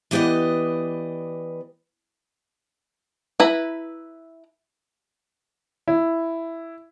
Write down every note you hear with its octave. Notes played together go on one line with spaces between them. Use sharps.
E3 B3 G4 D5 D#5
E4 B4 A#5
E4